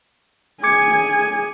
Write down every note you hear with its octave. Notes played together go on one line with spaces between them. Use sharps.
G#4 G#5 D6 G#6 C#7